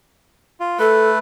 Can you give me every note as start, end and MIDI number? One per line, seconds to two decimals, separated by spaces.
0.60 0.78 65
0.79 1.19 57
0.79 1.09 69
0.79 1.19 71